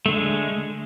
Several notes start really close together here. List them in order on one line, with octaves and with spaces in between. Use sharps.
A3 D3 G#3